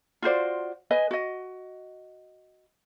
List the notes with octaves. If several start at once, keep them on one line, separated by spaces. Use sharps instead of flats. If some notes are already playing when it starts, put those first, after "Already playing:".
F4 F#4 C5 D5
B4 D#5 G#5
F#4 D#5